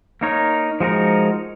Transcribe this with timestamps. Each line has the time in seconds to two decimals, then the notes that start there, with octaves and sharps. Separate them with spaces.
0.21 A#3 D#4 A#4 C#5
0.80 F3 G#3 D#4 F#4 A#4